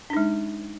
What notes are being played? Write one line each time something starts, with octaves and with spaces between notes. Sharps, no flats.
G#3 D4 D#4